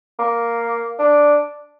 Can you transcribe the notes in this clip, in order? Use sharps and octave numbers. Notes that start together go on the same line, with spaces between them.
A#3
D4